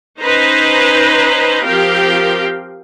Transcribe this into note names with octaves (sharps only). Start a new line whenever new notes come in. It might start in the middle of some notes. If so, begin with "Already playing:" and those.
C#4 D#4 B4 C5 A#5
F3 C4 G4 A#4 F5 G5